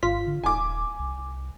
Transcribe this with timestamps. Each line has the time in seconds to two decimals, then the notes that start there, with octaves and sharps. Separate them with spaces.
0.03 G#1 F4 B6
0.27 D3
0.44 D#1 G#5 D6
0.99 C2